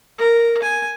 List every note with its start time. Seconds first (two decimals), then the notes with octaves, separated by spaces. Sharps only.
0.18 A#4
0.62 G#5